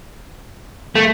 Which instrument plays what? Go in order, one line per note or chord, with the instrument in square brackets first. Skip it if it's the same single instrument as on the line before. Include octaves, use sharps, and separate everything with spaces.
[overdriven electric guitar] A3